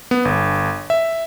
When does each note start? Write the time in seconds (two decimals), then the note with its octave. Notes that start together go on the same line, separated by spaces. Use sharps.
0.11 B3
0.25 G1
0.90 E5